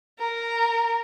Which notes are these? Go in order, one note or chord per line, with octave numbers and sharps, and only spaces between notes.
A#4